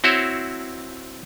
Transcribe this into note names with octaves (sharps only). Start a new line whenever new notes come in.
C4 E4 F#4 C5 C#5